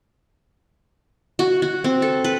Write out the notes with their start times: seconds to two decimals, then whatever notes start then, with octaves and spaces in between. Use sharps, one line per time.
1.39 F#4
1.62 F#4
1.84 C4
2.02 A4
2.24 B4